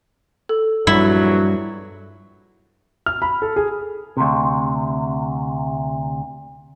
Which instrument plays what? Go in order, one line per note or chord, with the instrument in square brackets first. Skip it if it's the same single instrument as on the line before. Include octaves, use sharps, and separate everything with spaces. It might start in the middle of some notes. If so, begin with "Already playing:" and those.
[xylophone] A4
[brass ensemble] A#1 E2 F#3 [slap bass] G2 [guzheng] E4
[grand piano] F6
B5
A4
G#4
[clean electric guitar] D2 C3